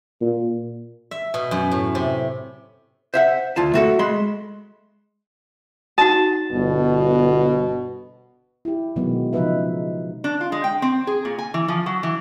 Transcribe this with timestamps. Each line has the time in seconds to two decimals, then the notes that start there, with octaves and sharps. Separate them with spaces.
0.21 A#2
1.11 E5
1.34 B2
1.51 F#2
1.71 A2
1.95 C3
3.14 C5 E5 F#5
3.56 D2 F4 A5
3.74 A3 F#4 A4
3.99 G#3 B5 C6
5.98 D#4 F#4 A5
6.52 G1 B2
8.65 E4 G4
8.96 B2 D#3 F#3 G#3 B3
9.33 C#3 F3 D#4 F4 B4 E5
10.24 D4
10.41 F4
10.52 G#3
10.64 G5
10.82 C4
11.07 G#4
11.25 A#2
11.39 G#5
11.54 E3
11.68 F3
11.86 F#3
12.03 E3